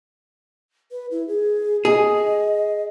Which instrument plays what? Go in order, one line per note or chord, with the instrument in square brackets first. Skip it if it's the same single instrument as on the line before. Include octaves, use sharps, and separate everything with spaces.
[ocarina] B4
E4
G#4
[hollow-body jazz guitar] G#4 [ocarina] D#5